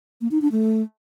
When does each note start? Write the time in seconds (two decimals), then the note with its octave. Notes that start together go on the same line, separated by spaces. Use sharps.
0.21 A#3
0.31 D#4
0.41 D4
0.52 A3